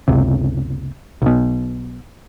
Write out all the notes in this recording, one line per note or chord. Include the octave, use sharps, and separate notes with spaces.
F#1 C#2 C3
B1 B2